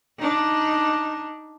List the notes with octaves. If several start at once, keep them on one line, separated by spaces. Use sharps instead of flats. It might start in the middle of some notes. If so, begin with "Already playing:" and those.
D4 D#4